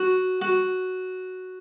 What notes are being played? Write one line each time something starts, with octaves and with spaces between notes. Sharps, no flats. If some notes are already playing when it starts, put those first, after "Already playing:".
Already playing: F#4
F#4